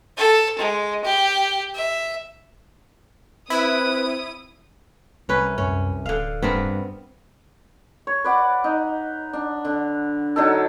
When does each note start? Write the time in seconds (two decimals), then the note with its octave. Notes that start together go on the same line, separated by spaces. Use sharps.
0.17 A4
0.58 G#3
1.05 G4
1.75 E5
3.50 C4 E4 B4 D#6
5.29 C2 C#4 B4
5.58 F#2 C#4
6.06 D1 D3 F5
6.42 G2 B3 C4 A#4
8.07 C#5
8.25 B4 D5 F#5
8.64 D#4
9.33 D4
9.65 D3
10.36 D3 F#3 D#4 A4